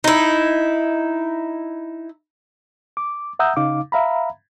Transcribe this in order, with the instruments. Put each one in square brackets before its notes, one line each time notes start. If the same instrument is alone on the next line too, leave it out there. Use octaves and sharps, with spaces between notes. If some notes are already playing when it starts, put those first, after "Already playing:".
[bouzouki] D#4 E4
[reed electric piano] D6
E5 F#5 A#5 D#6 E6 G6
C#3 D#4 F5 D6
E5 F5 A#5 B5